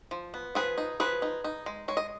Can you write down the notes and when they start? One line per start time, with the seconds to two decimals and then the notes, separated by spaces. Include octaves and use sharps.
0.11 F3
0.34 B3
0.55 F3 G#4 B4
0.78 D#4
1.00 F3 G#4 B4
1.22 D#4
1.44 D#4
1.66 G#3
1.88 G#3 C#5
1.97 D#5